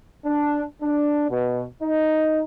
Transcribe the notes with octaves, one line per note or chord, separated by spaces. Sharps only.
D4
D4
B2
D#4